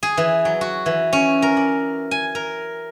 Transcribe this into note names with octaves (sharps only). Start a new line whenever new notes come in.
G#4
E3
F#3
F#4
E3
C#4
A#4
D5
G#5
A#4